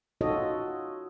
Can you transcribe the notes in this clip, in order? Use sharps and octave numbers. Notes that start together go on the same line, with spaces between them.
D#4 F4 F#4 A4 C#5 D#5